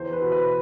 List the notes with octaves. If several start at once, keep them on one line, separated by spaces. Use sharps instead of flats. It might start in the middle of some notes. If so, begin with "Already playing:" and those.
Already playing: E2 C5
B4
B2
B4